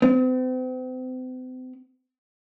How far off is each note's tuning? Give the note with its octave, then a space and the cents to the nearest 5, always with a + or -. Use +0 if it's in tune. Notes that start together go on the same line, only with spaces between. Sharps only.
C4 -40